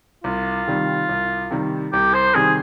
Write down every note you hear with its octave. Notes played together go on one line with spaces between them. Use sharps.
C2 F4
C3 D#3 G3
C2
C3 D#3 G3
C2 G4
C5
C3 D#3 G3 G#4